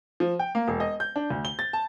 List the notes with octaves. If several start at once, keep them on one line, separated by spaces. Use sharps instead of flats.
F3
G5
A#3
E1
D#5
G6
D4
D2
G7
A6
A5